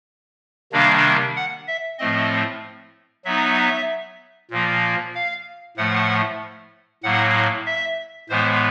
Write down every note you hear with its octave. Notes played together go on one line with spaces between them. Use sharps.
C3 D#3 G3 A#3 D4 F5
F#5
E5
A2 F3 A3 C4 D#5
F#3 B3 D#4 E5
A#2 F3 A#3
F5
A2 F3 A3 F#5
A2 F#3 A#3 F#5
E5
A2 E3 G#3 B3 C5